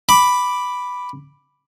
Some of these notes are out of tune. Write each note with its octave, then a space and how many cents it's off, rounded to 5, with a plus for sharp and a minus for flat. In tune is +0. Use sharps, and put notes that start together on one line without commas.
B5 +0 D6 +0